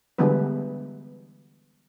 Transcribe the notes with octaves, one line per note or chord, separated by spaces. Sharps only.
D3 E3 G3 G#3 B3 B4